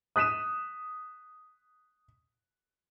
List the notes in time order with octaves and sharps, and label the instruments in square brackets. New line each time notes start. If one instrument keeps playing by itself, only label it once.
[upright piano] D#6 F#6 B6 D#7 E7